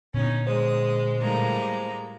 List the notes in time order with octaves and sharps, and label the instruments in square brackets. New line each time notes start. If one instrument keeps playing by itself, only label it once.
[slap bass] A#2 D3 B3 [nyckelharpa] C#4 D#4
[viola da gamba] G#3 [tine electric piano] C5 [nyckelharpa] D#6
[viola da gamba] A2 G3 A#3 [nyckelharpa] G#3 A#5